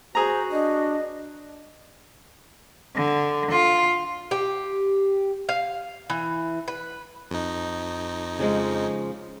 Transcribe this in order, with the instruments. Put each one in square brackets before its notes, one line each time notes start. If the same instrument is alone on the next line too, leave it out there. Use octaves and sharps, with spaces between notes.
[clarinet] F#4 [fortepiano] G#4 A#5 [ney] C5
[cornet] D4 [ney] D#5
[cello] D3
F4
[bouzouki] G4
F5
E3
B4
[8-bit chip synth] F2 D#4
[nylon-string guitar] C#3 F3 G#3